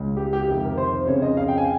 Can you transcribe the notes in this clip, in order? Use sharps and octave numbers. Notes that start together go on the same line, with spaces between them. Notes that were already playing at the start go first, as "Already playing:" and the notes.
Already playing: C#2 C#3
G4
G4
F2 C3 D#3
A#4
C5
F2 C#3 C#5
D#5
F5
G5
G#5